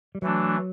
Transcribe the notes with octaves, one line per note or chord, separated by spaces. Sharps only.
G3
E3 F#3 A3 D4